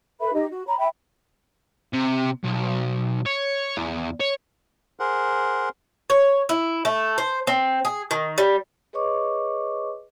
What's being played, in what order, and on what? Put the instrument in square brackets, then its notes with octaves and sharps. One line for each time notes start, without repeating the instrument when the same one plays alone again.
[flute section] A4 B4 E5 B5
D#4 G4 D#5
F#4
C#5 A#5 B5
E5 G5 B5
[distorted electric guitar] C3
B1
C#5
E2
C#5
[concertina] G#4 A#4 C5 F#5
[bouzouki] C#5
E4
A3
C5
C4
G#4
D#3
G3
[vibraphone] G#4 B4 C#5 D#5 C#6 D6